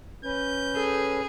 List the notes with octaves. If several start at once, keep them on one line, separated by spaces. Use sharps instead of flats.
C#4 B4 G6
G#4 A4